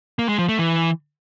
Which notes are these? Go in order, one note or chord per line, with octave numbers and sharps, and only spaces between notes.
A#3
G#3
F3
A3
E3